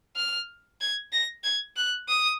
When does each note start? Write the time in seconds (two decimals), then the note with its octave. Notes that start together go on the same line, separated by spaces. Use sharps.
0.16 F6
0.81 G#6
1.13 A#6
1.44 G#6
1.76 F#6
2.09 D#6